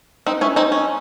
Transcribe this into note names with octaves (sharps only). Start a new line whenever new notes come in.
C4 D#4
C#4 E4
C4 D#4
C#4